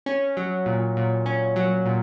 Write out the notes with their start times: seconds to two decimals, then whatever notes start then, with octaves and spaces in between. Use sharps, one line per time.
0.06 C#4
0.37 F#3
0.66 A#2
0.97 A#2
1.26 C#4
1.56 F#3
1.86 A#2